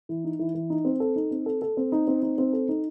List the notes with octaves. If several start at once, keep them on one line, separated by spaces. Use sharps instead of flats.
E3
D#4
E3
E3
D#4
C4
A4
D#4
C4
A4
A4
C4
D#4
C4
D#4
C4
A4
D#4